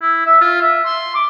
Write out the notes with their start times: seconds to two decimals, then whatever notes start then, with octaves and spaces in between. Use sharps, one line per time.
0.02 E4
0.26 E5
0.41 F4
0.61 E5
0.86 C6
1.15 D6